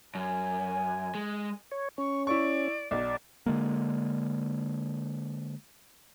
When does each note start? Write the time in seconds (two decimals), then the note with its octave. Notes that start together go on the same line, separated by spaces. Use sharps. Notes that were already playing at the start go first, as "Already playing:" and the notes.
0.15 F#2 G#5
1.15 G#3
1.72 C#5
1.98 C#4 C#6
2.27 E4 D5 C#6
2.91 B1 D5
3.46 D3 G#3 A#3